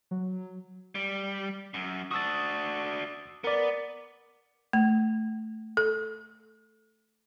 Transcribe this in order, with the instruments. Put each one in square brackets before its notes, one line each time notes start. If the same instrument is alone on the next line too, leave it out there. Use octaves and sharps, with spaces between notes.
[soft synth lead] F#3
[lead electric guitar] G3
F#2
[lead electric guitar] D4 F#4 [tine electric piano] D#6 E6 A6
[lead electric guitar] B3 [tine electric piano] A#4 D5
[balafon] A3
A4